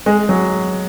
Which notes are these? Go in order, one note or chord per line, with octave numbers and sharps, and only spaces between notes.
G#3
F#3